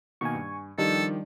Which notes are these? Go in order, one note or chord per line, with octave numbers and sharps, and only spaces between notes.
B2 D#3 A#3 G#5 C#6
G2
D#3 F3 G3 D4 D#4 G4 A4